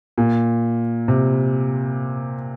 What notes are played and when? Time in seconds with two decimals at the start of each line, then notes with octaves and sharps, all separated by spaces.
0.18 A#2
1.08 C3